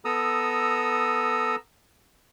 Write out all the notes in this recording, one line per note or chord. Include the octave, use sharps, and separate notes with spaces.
B3 A4 A#5 D#6 E6